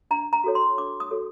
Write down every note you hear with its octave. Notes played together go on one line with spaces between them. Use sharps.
D4 A#5
A#5
F#4 A4 C#5
C6
D4 D6
D#6
F#4 A4 C#5